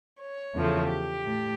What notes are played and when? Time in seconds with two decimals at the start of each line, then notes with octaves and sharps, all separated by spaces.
0.20 C#5
0.55 E2 C#3 F3 A3
0.90 G4
1.25 A2